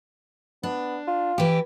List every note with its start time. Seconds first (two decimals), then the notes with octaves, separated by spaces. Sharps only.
0.63 B3 D4
1.07 F4
1.38 E3 G4